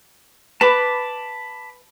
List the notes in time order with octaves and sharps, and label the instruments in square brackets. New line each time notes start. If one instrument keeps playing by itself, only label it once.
[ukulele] B4 [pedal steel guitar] A5 B5 D6